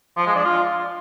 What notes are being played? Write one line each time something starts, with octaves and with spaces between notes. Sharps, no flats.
F3
G#3
D4
F4